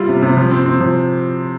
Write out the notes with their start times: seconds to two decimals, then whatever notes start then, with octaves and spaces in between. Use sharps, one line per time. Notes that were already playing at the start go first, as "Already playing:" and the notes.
Already playing: G3 E4 F4
0.09 C3
0.22 C3
0.37 F3
0.51 C4
0.66 C4
0.80 F3